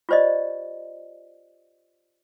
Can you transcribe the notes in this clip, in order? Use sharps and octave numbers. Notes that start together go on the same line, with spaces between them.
F4 G4 C5 D5 D#5